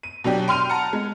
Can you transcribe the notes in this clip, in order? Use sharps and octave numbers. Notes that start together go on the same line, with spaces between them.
D#7
B2 F#3 D4 G4
G5 C6 F6 D#7 F7
F#5 A5 A#5
G#3